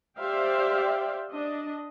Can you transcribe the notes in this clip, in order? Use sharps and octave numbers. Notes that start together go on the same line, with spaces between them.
G4 C5 D5 E5 F5 G5
D4 D#5